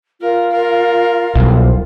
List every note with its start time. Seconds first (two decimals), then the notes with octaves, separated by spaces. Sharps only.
0.21 F4 A#4
0.51 A#4
1.35 C2 B2 F#3